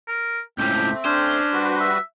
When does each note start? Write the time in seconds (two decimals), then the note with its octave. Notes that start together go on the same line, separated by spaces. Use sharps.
0.08 A#4
0.59 C#2 A2 A3 C4 G4
1.05 C#4 D4 C5
1.52 G3 F#4 B4
1.80 E5